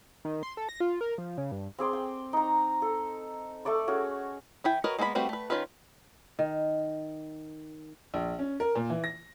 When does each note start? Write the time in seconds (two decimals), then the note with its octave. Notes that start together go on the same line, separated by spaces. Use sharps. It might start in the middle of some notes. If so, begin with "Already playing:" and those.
0.25 D#3
0.43 C6
0.57 A4
0.69 A#6
0.80 F4
1.01 A#4
1.18 F3
1.38 C#3
1.52 G2
1.79 C4 G#4 D5 C6
1.93 G5
2.33 D#4 A#5
2.82 A4
3.65 A3 A4 D5 C#6
3.88 C#4 F#4 G#4
4.64 E3 E4 G5
4.84 F#4 A#4 B4 C#5 D#5
4.99 G#3 A#3 B3 A4 B5
5.15 G3 A3 C4 F#4 B4
5.29 A3 B4
5.50 D#3 C#4 F4 B4
6.39 D#3
8.14 A#1
8.39 C#4
8.60 A#4
8.75 A#2
8.90 E3
9.04 A#6